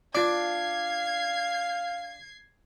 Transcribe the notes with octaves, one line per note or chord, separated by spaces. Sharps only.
D4 F4 F5 D6 G#6 C7